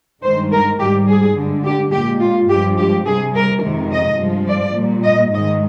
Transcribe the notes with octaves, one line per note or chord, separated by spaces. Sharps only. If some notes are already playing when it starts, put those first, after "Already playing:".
G2 D#3 G#3 C5
A#4
G#2 G3 G4
G#4
G2 D3 G#3
G4
A#2 G#3 G4
F4
G2 F3 G#3 G4
G4
C3 G3 G#4
A#4
F2 C3 D#3 G#3
D#5
G2 F3 G#3
D5
A#2 G3
D#5
G#2 D#3 G#3 D#5